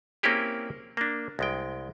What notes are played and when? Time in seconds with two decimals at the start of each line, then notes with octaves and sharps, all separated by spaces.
0.23 A#3 C4 C#4 E4 G4 G#4
0.97 A#3 D4
1.39 C2 G#3 G5